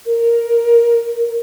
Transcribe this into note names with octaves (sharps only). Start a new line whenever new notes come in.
A#4